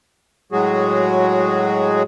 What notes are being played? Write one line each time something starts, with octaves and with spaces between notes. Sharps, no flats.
A2 F#3 G#3 F#4 G#4